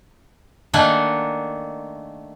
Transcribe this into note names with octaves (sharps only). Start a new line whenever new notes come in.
D#3 A3 A#3 D4 F#5 G#5